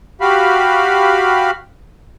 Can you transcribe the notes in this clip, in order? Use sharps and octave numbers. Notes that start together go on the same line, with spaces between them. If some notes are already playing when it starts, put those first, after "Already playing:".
F#4 G4 F5 B5